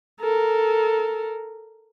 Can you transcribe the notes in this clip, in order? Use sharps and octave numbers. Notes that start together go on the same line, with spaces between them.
A4 A#4